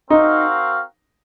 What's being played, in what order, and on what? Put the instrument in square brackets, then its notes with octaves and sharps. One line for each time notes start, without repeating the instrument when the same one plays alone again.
[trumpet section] C4 F#4 A#4 F5 [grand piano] D#4